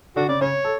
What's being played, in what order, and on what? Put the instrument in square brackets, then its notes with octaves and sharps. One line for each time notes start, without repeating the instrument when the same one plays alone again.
[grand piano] D3 D4 [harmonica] F#4
[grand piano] C#3 C#4 [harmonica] D5
[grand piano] C#3 C#4 [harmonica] C#5
[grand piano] A4